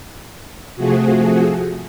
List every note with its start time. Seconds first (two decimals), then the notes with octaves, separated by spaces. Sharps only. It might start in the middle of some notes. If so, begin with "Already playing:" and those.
0.76 C3 F3 A3 F#4 G#4